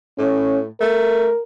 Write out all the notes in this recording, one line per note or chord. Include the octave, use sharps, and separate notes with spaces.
A2 C#4
A3 A#4